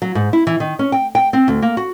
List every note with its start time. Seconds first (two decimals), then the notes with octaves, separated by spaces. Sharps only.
0.02 F#3
0.15 G#2
0.33 E4
0.47 E3
0.60 D#3
0.79 C#4
0.92 G5
1.15 G5
1.33 C4
1.48 D2
1.62 A#3
1.77 F#4